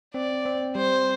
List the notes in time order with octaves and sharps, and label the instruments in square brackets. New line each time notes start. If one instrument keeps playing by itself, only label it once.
[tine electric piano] C4 [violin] D5
[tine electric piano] C4
[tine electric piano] G3 [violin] C5